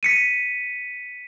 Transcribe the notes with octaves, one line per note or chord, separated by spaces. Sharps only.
B6 C#7 D#7